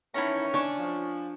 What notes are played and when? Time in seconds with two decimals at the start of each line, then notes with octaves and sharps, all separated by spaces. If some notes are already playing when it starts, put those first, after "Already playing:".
0.14 D#3 E3 C#4 E4 A5 A#5
0.54 D4 G#5 C#6
0.78 F3